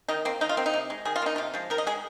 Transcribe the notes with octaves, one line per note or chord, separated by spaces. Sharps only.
D#3 D#4
A#3 C4
D#3 D#4
F4
A#3 C4
D#4
C3
G#3
D#3 G#4
F4
A#3 D#4
C3 F4
F3 G#3
D#3 A#4
D#5
G#3 G#4